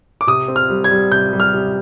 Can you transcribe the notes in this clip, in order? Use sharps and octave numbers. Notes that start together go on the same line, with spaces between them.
D6
C3 D#6
C4
F6
G3
G#6
G3
C3 G6
G3
F6
C3